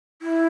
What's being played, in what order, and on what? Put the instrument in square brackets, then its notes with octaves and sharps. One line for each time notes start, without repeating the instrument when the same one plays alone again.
[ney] E4